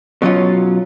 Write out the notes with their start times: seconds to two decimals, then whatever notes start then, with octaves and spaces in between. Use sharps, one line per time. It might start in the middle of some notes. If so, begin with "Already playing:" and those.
0.22 B2 F#3 C#4 F4